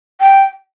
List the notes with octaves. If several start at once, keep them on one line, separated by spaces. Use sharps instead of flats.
G5